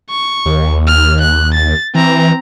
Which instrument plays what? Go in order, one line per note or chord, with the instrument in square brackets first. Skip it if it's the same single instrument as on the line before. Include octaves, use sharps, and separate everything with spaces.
[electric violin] C#6
[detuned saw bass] D#2
[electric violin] F6
F#6
A6
[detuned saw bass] E3 [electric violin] C4 A#5